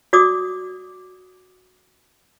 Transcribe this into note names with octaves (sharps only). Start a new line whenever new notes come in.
F#4 D5 D6 D#6